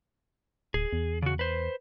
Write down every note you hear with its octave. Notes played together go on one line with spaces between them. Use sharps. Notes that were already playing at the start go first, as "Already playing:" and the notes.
D1 G#4
E2
C#3 F#4
B4 C5